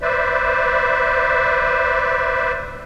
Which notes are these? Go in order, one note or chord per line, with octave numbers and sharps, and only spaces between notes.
B4 C5 D5 E5